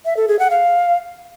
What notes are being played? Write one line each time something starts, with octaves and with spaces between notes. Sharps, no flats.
E5
A4
G#4
F#5
F5